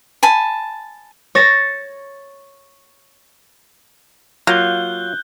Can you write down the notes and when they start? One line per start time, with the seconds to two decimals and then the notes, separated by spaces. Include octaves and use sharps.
0.23 G#5 A5 B5
1.35 C#5 A6 A#6 E7
4.47 F#3 A#3 F4 F5 F#6 G6 G7